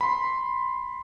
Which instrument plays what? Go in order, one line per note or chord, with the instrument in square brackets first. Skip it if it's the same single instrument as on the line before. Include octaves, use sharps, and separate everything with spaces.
[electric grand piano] B5 C6